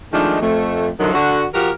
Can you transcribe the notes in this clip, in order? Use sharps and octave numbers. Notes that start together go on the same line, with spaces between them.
D#3 F3 G#3 A3 D4 D#4
F2 A3
F#2 D3 D#3 F3 F#3
D3 F#4
F3 F#4 G4 A#4